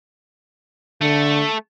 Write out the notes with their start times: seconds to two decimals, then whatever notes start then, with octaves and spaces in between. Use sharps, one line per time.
1.01 D3 A3